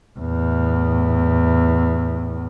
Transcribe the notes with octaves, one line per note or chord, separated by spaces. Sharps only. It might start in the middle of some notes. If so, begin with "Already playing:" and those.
E2 A2